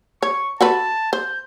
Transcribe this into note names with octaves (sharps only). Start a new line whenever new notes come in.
C#5 C#6
F#4 A4 B4 A5
C5 G6